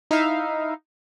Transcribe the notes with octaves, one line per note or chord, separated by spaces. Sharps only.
D#4 E4 E5 F5